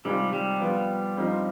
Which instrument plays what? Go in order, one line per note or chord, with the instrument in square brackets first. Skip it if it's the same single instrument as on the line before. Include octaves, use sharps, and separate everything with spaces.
[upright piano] C3 D#3 G#3 C4 F4 [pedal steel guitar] G3
[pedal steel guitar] G3
[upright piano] F3 B3 F4
G2 F3 C4 D#4